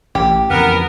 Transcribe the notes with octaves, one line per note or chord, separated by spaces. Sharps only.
A1 G4
F2 C#3 E3 B3 A#4